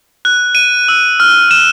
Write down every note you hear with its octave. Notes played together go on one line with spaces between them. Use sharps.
F#6
D#7
E6
F6
E7